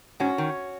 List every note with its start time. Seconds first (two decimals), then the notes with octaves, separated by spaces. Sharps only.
0.20 G#2 C#4 F#4
0.38 D#3